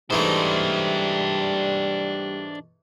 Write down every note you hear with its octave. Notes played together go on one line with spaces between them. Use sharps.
G#2 E3 G3 A3 D4 C5